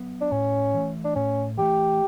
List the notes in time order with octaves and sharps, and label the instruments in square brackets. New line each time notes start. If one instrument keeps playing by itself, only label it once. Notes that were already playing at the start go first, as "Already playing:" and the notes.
Already playing: [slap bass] F#3 B3
[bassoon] D4
[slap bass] A2 [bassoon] C#4
[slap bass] E3 A3
[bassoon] D4
[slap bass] A2 [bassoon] C#4
[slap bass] E3 A3 [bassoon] G4